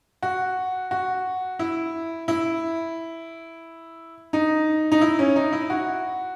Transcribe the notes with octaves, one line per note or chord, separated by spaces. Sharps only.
F#4
F#4
E4
E4
D#4
D#4
E4
C#4
D#4
E4
F#4